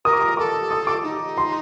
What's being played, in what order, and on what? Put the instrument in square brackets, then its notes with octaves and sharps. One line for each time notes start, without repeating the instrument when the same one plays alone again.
[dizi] A#4 [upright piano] D#6
[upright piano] D6
D#6
[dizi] A4 [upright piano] D6
[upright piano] D#6
D6
[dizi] D#4
[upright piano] C6